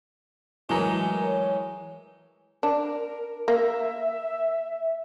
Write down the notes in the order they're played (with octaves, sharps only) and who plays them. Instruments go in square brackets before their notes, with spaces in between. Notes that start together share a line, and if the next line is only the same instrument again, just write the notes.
[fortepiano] A2 F#3 A#5 [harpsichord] E3 G#3 [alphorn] A#4
[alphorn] C#5
[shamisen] D4 [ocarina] A#4
[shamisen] A#3 [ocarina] E5